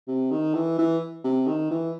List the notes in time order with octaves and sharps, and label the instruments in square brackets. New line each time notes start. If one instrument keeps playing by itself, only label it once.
[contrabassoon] C3
D#3
E3
E3
C3
D#3
E3